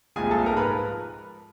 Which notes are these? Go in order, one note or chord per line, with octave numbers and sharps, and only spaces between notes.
C2 A#2 F3 G#3 G#4 G#5
A4 A5
G#2 F3 G#3 A#4 A#5
B4 B5